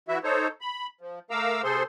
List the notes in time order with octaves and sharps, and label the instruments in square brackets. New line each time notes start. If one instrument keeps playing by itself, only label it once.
[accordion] E3 E4 F#4 E5
D#4 A4 C5 C#5
B5
F3
A3 A#4 F5 A#5 D6 E6
C3 G#4 A4 C5 C6